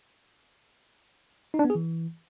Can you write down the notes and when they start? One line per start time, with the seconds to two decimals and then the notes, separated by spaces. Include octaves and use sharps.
1.54 D#4
1.59 D4
1.65 B3
1.70 G#4
1.75 E3